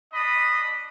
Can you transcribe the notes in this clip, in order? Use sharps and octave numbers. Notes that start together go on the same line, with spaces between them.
D4 D#5 B5 D#6